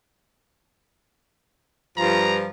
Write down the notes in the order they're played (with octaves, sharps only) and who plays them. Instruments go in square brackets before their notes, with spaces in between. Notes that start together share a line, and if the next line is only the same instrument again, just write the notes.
[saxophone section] G2 F3 [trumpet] A#5